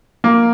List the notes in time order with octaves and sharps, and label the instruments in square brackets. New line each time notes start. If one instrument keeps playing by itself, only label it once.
[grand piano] A#3